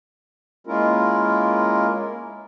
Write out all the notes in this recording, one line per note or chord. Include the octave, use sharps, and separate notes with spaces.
G#3 A#3 C#4 E4 F4 A#4